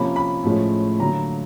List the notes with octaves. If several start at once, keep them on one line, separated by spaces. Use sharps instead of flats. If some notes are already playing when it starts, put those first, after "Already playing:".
Already playing: C3 F3 A#3 C#4 B5
B5
A2 F3 G#3 C#4
D3 F#3 A#3 A#5